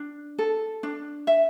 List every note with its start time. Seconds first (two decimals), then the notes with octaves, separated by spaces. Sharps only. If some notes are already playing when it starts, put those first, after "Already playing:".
Already playing: D4
0.38 A4
0.83 D4
1.27 E5